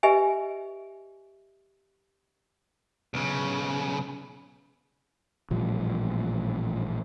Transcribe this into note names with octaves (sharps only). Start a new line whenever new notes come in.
G4 B4 D#5 E5 G#5
B1 C#3
A1 A#2 F3 G3